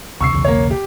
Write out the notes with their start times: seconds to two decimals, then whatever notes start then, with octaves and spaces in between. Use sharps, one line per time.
0.21 D2 C3 C#6 E6 C7
0.33 B1 E2 C#3
0.45 A#3 C#5
0.71 G4